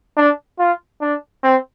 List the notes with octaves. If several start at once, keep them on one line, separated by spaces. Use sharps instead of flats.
D4
F4
D4
C4